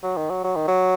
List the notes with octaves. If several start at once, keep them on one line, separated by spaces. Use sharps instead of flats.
F#3
D#3
F#3
F#3
D#3
F#3